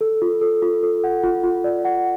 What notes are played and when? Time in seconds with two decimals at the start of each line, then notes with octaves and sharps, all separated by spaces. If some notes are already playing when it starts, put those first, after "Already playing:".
0.01 A4
0.22 F4
0.41 A4
0.62 F4
0.83 A4
1.04 F#5
1.23 F4
1.43 F4
1.64 D5
1.85 F#5